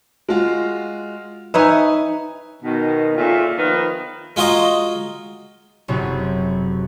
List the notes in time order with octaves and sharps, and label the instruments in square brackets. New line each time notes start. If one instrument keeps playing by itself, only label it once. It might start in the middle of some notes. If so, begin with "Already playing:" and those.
[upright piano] G#3 F4 F#4
[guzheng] D#4 C#5 E5 [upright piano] B4 G#5
[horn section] B2 D#3
A#2 C#3 A3 F4
D#3 F3 B3 D#4 B4
[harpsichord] G#3 F4 F#4 D#5 A#5
[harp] F#1 F#2 C3